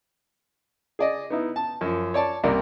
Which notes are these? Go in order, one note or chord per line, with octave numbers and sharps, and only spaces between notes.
G#4 D5 D#5
B3 D#4 E4
A5
F#2 F3
C#5 D5 A5
C2 C3 A#3 A#4 D5